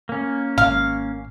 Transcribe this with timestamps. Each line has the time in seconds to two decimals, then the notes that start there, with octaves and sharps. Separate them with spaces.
0.09 A#3 C#4
0.58 G#1 F5